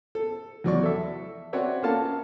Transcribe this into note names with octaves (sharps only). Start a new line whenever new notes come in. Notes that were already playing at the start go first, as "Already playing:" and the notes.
A4
E2 F#3 D5 C#6
A4 E5
C4 F#4 B4 C#5 D5 E5
A#3 C#4 F4 A4 F5 A5